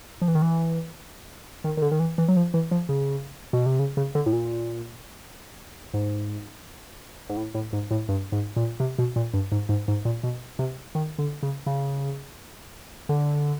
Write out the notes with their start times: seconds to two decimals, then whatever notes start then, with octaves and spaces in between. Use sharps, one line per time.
0.21 F3
0.28 E3
0.35 D#3
0.42 E3
1.64 D#3
1.77 D#3
1.82 D3
1.92 D#3
2.00 E3
2.18 E3
2.28 F#3
2.36 F3
2.54 E3
2.71 F3
2.89 C#3
3.53 B2
3.66 C3
3.79 C#3
3.97 C#3
4.15 D3
4.26 A2
4.33 A#2
5.94 G#2
7.29 G#2
7.37 A2
7.55 A2
7.73 G#2
7.91 A2
8.09 G2
8.32 G#2
8.56 A#2
8.80 C3
8.99 B2
9.16 A#2
9.34 G2
9.52 G#2
9.69 G#2
9.88 G#2
10.05 A#2
10.23 B2
10.59 C3
10.95 D#3
11.19 D3
11.43 C#3
11.66 C#3
13.09 D3